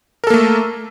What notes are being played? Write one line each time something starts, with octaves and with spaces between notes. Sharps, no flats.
A3 A#3 A4 A#4